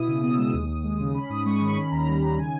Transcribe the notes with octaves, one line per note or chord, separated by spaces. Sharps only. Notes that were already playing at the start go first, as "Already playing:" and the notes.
Already playing: B2 E4 D#6
C#3
B3 D#6
E6
G#3 D#6
D#2
D#2
G#3
C#3
C#4 B5
G#2 D#6
G#3 C#6
D#3 B5
C#6
C#4 B5
D#2 A#5
G3
D#3
C#3 G#5